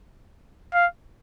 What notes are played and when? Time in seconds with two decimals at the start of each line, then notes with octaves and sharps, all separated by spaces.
0.74 F5